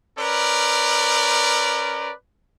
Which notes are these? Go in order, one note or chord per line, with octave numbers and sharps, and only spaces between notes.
C#4 A#4 B4 D5